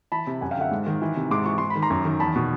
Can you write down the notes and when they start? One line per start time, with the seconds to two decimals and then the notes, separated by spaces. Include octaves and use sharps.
0.12 E3 A5 B5
0.27 C3
0.41 F#2 F#5 G#5
0.51 F5 G5
0.57 D3 E5 F#5
0.71 G#2
0.86 D#3
1.02 E3
1.16 C3
1.31 G#2 C6 D6
1.46 E3 C#6
1.58 G#2 C6
1.70 B5
1.75 D#3
1.82 A#5 C6
1.90 F#2
2.05 D#3
2.20 E2 A5 B5
2.36 B2